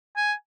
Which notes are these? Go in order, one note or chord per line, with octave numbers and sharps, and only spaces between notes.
G#5